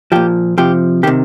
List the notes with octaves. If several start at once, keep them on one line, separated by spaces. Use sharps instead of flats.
A#2 F3 G4
C3 F3 G4
C3 D#3 G4